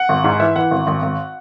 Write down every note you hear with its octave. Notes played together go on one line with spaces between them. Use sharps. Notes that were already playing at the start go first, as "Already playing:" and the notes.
Already playing: F#5
G#1
G#2
E3 E5
E3 F#5
G#1
G#1
G#1